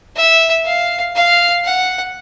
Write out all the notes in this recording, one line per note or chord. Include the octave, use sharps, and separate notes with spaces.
E5
F5
F5
F#5